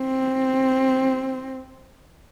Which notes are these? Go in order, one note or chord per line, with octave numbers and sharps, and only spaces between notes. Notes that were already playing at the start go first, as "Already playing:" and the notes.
Already playing: C4